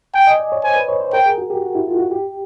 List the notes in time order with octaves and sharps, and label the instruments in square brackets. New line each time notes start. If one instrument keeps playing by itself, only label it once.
[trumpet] G5 [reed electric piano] G#5
[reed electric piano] D#5
D5
C#5
[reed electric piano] C5 [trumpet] G#5
[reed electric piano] B4
C#5
C5
[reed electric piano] A#4 [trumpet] G5
[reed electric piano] G#4
F#4
G4
F#4
E4
F4
F#4
G4